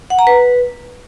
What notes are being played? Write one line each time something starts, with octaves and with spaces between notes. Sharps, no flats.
F#5
A#5
B4